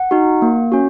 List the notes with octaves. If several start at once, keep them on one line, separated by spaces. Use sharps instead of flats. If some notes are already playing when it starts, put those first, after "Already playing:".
Already playing: F#5
D#4 F#4
A#3
C#4 F#4